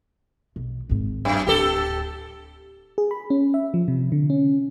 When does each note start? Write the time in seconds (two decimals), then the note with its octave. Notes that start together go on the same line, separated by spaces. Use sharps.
0.56 B1
0.89 G#1 G#2
1.25 F#2
1.47 D1 G4 A4
2.98 G#4
3.11 B5
3.30 C#4
3.54 E5
3.74 F3
3.88 C3
4.12 D3
4.30 C#4